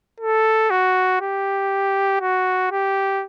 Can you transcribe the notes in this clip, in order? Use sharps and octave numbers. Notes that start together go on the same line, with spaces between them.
A4
F#4
G4
F#4
G4